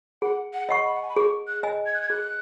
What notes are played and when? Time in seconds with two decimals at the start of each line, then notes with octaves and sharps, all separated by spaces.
0.22 G#4 F#5
0.53 F#5
0.69 D#5 F#5 C#6
0.84 B5
0.94 F#5
1.02 G#5
1.09 B5
1.16 G#4 C#6
1.47 F#6
1.63 D#5 G#5
1.86 G#6
1.94 F#6
2.02 G#6
2.10 G#4 F#6